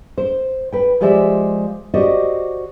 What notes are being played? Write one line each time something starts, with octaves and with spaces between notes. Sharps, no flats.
C5
B4 G5
F3 G#3 G4 C5 D5 E5
F#4 G4 C5 D5 D#5